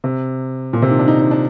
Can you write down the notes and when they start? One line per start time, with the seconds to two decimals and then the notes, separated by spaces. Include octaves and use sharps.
0.04 C3
0.73 A#2
0.82 C3
0.91 D#3
0.99 D4
1.08 D#4
1.19 D#4
1.31 D4